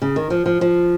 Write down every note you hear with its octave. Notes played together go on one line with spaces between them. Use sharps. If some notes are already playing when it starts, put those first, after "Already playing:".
C#3
D#3
F3
F3
F3